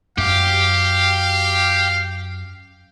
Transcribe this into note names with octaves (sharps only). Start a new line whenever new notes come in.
F#2 G4 F5